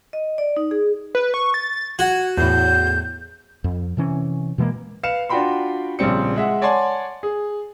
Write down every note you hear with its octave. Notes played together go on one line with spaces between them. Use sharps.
D#5
D5
D#4
G#4
B4
C#6
A6
F#4 G#6
E2 A2 G6
F2
C3 E3 C#4
B2 E3 G#3 A#3
B4 F5 C#7 E7
D4 F4 F#4 G5 B5 C6
A#1 C#3 G3 C4 C#7
G#3 E5 F#5
C#5 D5 F#5 G#5 A5 C6
G#4